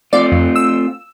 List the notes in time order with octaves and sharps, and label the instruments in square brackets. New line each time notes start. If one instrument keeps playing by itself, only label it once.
[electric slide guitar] A3 C4 F4 [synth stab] D5
[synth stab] F2
E6